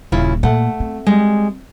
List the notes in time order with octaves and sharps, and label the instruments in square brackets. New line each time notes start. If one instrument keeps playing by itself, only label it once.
[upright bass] D#1 [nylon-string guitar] C#3 E4 F4
[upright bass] A#2 [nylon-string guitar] A3 F#5
[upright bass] C4
[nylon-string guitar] G3 G#3